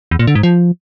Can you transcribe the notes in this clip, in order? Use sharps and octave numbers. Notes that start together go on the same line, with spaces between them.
E2
A#2
D3
G#2
F3